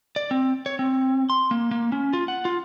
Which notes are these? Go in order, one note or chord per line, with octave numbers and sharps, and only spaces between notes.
D5
C4
C#5
C4
C6
A#3
A#3
C#4
F4
F#5
F4